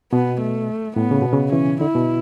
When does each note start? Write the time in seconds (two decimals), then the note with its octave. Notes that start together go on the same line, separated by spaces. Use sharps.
0.12 B2 B3
0.41 A3
0.96 A2 B3
1.11 C#3
1.22 B2
1.33 C#3
1.52 E3 C#4
1.81 D3 E4
1.95 B2